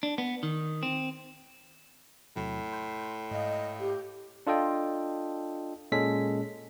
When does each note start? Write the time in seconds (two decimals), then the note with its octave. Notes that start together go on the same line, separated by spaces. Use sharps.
0.03 D4
0.18 B3
0.43 D#3
0.83 C4
2.36 E2 A2 C3 F#3
2.72 C6 G6 C7
3.31 G#2 D#5 F5
3.79 G4
4.47 D4 F4 A4 D#5 G5
5.92 A#2 G#3 C#4 A4 B6